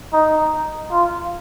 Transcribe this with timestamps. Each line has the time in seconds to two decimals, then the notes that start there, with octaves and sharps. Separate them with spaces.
0.13 D#4
0.91 F4